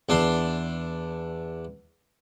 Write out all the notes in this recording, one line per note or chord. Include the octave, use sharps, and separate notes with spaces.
E2 D4 C6